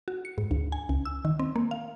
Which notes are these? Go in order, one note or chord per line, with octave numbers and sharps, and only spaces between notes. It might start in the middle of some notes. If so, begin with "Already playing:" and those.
F#4
C#7
G#2
D2
G#5
C#2
E6
D#3
C4
A#3
F5